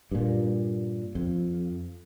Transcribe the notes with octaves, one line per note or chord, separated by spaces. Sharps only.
G2 A#2
F2